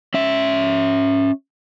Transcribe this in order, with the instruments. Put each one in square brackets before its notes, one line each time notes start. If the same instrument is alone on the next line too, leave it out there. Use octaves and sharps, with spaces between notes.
[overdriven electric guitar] C#4 E5